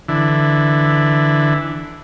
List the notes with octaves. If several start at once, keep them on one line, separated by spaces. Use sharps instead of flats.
D3 E3